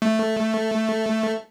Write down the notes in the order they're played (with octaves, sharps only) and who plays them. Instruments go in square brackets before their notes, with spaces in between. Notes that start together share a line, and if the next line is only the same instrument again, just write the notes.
[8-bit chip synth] A3